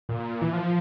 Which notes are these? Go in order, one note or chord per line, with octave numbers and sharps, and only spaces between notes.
A#2
E3
F3